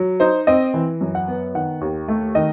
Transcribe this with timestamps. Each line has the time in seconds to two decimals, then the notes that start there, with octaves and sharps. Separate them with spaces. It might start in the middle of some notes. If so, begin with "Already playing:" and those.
Already playing: F#3
0.20 D#4 C5
0.47 C4 D#5
0.74 E3
1.01 F#2
1.15 F#5
1.28 B3
1.55 D#3 F#5
1.81 D#2
2.08 A3
2.35 D#3 D#5